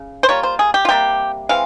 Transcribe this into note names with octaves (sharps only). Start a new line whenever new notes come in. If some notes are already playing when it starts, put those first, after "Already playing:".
Already playing: C#3
C5
G3 A#3 F4 C#5
C5
G#4
G4
F4
C3 G3 A#3 G4
E3 G#3 C4 F5